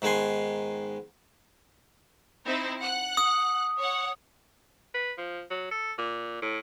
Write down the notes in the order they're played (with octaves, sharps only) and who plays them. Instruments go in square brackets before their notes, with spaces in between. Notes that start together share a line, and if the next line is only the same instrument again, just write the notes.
[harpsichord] G#2 D#3 B3 G#5 C6
[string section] C4 D#4 E4
F#5 F#6
[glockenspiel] D#6
[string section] C#5 F#5
[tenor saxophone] B4
F3
F#3
A4
A#2
A2